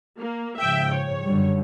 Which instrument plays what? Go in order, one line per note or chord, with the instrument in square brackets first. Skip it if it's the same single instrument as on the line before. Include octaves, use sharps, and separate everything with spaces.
[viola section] A#3
[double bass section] G#2 C#3 F3 [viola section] E5 G5
[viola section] C#5
[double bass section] F#2 D3 G3